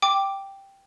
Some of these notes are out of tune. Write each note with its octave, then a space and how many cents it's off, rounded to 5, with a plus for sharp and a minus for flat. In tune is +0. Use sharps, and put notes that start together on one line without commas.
G5 +0 D6 +0